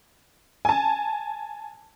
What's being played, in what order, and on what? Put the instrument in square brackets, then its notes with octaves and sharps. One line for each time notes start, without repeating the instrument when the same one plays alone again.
[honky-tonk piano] G#5 A5